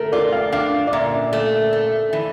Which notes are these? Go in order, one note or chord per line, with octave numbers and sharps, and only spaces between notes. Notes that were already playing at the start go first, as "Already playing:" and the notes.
Already playing: A3 A#4
F4 D5
F5
D4 F5
D5
A#2 E5
A3
A3
E3